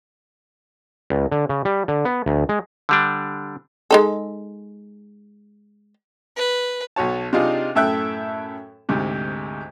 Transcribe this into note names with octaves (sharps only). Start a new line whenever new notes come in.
C#2
D3
C#3
G3
D3
B3
D2
G#3
D3 G3 D4
G#3 D#4 A4
B4
B1 F#4 C#5 A5
C3 D4 D#4 F4 G#4
F#2 A2 A4 E5 G5 F#6
D2 G#2 C3